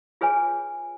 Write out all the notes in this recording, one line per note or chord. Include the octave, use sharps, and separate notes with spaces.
F4 G#4 B4 C#5 G#5